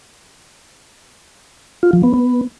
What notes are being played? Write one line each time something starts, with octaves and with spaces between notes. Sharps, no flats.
F4
F3
B3
B3